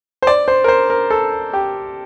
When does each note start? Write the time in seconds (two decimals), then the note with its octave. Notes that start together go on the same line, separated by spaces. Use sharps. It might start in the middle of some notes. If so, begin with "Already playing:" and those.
0.22 C5
0.27 D5
0.48 C5
0.64 A#4
0.68 C5
0.90 A#4
1.10 A4
1.53 G4